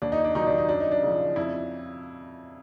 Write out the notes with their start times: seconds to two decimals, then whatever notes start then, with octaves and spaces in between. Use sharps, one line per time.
0.02 D#2 D4
0.12 D#4
0.24 D4
0.35 D#3 F#3 D#4
0.46 D4
0.58 D#4
0.69 F#2 D4
0.80 D#4
0.91 D4
1.02 C#3 F3
1.36 F2 E4